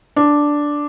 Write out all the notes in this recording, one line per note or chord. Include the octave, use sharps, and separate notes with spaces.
D4